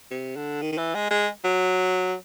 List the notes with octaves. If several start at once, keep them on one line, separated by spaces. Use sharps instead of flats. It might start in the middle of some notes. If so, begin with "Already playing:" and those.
C3
D3
D#3
D#3
E3
G#3
G#3
F#3